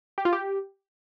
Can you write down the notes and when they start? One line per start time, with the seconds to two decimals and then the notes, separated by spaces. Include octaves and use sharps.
0.18 G4
0.25 F4
0.33 G4